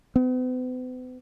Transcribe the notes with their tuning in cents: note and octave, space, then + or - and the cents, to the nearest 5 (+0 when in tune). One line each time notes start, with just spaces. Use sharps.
B3 +45